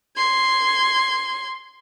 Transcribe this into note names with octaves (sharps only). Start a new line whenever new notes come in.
C6 G#6